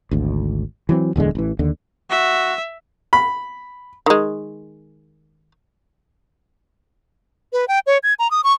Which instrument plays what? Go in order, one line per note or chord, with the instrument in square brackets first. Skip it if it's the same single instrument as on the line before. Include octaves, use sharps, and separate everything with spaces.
[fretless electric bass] G#1 D2
E3 F#3 C4
D1 E2 D3 G#3
A1 E3
D#2 D3
[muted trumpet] F#4 [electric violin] E5
[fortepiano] B5
[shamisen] D#3 G#3
[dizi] B4
G5
C#5
G#6
A#5
D#6
C#6